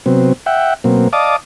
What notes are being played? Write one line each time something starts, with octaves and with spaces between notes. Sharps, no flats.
C3 F#3 B3 C4
E5 F#5 G5
B2 F#3 A#3 C4
D5 D#5 F5 A5 D6 D#6